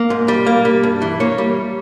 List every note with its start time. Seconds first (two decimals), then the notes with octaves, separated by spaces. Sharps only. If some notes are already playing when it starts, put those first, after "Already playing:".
Already playing: A#3
0.10 G#2
0.28 G3
0.46 A#3
0.65 G3
0.83 G2
1.02 E3
1.20 A#3 C#5
1.38 G3